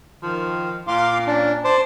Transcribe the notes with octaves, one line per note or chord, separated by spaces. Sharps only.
D#3 F3
A#2 F5 C6 D6
C#4 D4
C5 D5 A5 D6